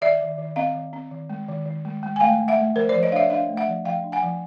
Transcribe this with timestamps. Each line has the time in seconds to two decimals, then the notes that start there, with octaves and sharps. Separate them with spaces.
0.01 D#3 D5 E5
0.21 D#3
0.38 D#3
0.56 C4 D#5 F5
0.75 D#3
0.93 C4
1.11 D#3
1.30 G#3
1.48 D#3
1.66 D#3
1.85 G#3
2.03 G#3
2.16 G#5
2.20 A3 F5 G5
2.39 A3
2.48 E5 F#5
2.57 A3
2.75 F3 A#4 C5
2.89 C5 D5
2.95 F3
3.03 C#5 D#5
3.12 D4 F5
3.16 D5 E5
3.30 D4 D#5 F5
3.49 A3
3.57 E5 F#5
3.67 F3
3.85 F3 F5 G5
4.04 D4
4.12 F#5 G#5
4.23 F3